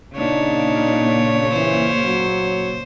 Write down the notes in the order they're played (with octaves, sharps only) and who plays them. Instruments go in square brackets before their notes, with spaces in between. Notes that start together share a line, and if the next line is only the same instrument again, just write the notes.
[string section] A#2 C#3 [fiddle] D4 [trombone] D#4 [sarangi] C#5
[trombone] E3 [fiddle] C5
[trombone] F#3